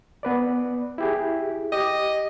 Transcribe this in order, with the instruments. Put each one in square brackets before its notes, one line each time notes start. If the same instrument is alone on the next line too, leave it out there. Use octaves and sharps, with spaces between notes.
[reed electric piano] B3 B4 D5
E4 G4 G#4
[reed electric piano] G4 D6 [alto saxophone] D#5